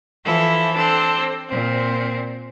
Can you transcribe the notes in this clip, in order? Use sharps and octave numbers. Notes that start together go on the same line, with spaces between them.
E3 F3 E4 A4
C4 D4 A4
A#2 C4